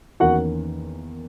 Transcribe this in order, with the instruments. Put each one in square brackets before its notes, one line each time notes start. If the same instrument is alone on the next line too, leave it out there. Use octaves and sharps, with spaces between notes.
[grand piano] E2 D#3 A#3 C#4 F#4 F#5